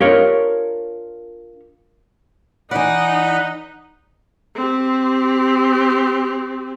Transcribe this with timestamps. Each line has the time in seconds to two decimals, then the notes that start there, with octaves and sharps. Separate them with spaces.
0.01 D4 F4 G4 A#4 C#5
2.71 E3 D#4 D5 F#5 B5 F#6
4.55 C4 G4